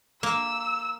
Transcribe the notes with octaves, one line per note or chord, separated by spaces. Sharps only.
A#3 E6